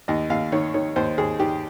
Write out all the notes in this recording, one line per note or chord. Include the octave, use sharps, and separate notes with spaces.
D#2 D#5
D#2 F5
D#3 C#5
D#3 C#5
D#2 C5
D#2 G#4
D#3 G4